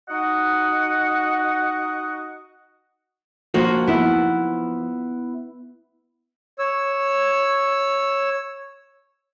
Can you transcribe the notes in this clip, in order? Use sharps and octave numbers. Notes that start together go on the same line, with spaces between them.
D#4 F#4 D#5 F#5
F3 A#3 F#4
B3 E4
C#5 E6